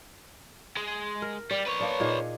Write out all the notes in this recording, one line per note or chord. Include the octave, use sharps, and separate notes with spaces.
G#3
A#4
G3 D5
B4 C#5
A#3 D4
A#2 D#4 G#4